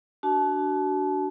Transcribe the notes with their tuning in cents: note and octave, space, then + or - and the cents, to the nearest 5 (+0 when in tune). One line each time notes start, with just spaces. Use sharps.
D4 +0 F#4 +25 A5 -30